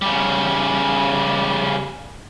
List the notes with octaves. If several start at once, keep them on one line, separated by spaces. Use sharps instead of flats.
C#3 G3